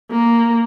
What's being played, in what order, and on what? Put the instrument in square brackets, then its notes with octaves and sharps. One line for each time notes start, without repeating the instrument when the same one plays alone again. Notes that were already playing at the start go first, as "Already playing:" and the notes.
[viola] A#3